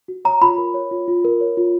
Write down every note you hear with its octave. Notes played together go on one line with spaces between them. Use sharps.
F#4
C#5 A#5
F4 B5
A#4
C#5
F4
F4
A#4
C#5
F4